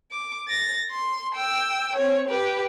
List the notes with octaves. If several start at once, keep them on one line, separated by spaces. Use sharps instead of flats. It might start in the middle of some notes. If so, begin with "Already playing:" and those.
D6
A6 A#6
C6
G5 E6
C4 C#5
G4 B4